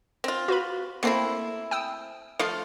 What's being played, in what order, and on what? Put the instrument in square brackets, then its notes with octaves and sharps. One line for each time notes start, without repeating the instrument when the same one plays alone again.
[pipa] C4 F4
[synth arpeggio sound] F#4 B4 B5
[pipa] A3 C4 E4 [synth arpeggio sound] A#3 C7
[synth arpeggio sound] G5 D#6 E6
[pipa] F3 A3 F4 [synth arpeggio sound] C7